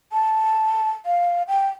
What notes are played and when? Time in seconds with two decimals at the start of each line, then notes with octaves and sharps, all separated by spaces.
0.12 A5
1.06 F5
1.48 G5